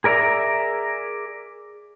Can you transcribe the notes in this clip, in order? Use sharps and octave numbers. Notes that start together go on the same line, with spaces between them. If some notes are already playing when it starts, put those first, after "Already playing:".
G#4 A#4 D5 E5 A#5